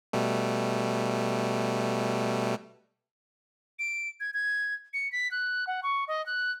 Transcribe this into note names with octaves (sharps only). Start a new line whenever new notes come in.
B2 G3 A3
D7
G#6
G#6
C#7
B6
F#6
F#5
C#6
D#5
F#6